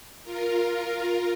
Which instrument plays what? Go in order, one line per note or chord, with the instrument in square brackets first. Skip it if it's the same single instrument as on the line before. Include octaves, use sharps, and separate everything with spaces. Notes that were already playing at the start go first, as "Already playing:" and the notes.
[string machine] F4 A#4